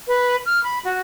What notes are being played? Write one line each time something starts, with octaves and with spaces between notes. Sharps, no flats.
B4
F6
B5
F#4